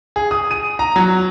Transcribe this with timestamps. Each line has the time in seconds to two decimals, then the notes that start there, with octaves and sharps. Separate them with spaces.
0.16 G#4
0.31 D#6
0.51 D#7
0.79 A#5
0.96 F#3